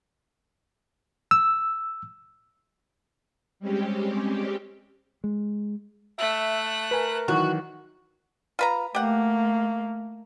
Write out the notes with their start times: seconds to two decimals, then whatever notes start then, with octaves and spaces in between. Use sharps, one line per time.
1.31 E6
3.60 G3 G#3 C4 C#4 G4
5.24 G#3
6.19 A3 E5 F#6
6.91 A#4 B4 G#5
7.28 D#3 E3 F#3 F#4
8.59 F4 B4 A#5
8.95 A3 A#3 G4 F#5